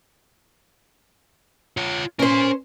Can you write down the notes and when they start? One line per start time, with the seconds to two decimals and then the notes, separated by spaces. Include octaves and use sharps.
1.77 F4 C#5
2.19 C#4 A#4 C5 C6